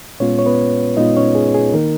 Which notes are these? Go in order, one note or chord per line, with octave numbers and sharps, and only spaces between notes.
A#2 G#3 B3 C#4 F4 C#5
C#5
B3 B4
A#2 G#3 B3 D#4 F4 D#5
C#4 C#5
G#4
G#4
D#3 A#3 D#4 A#4